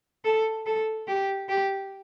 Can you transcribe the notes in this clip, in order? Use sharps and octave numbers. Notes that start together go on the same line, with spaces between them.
A4
A4
G4
G4